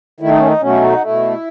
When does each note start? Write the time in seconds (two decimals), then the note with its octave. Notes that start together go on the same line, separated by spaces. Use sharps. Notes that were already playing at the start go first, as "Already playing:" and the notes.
0.20 D#3 A3 E4
0.30 D#4
0.38 C#4
0.47 D#4
0.61 B2 F#3 A3 C#4
0.81 D#4
0.92 F#4
1.01 B2 A3 E4